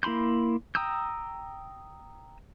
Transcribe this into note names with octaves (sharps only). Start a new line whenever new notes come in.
A#3 E4 B5 C6 G6
G5 A#5 D#6 E6 G6